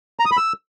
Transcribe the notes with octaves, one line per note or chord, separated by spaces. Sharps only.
A#5
D#6
B5
E6